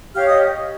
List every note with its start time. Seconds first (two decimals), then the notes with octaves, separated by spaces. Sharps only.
0.14 G4 C#5 F5 F6
0.26 D#5 D#6